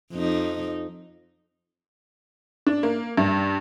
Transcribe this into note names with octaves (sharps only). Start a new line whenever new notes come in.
F2 D#4
D4
A#3
G2